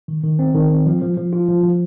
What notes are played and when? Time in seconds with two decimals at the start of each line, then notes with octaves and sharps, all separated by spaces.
0.08 D#3
0.24 D#3
0.39 C4
0.54 D#3
0.71 C4
0.86 F3
1.02 F3
1.17 F3
1.33 F4
1.48 F3
1.64 F3